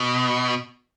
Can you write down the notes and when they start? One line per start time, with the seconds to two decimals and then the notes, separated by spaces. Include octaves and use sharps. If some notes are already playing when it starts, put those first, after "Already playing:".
Already playing: B2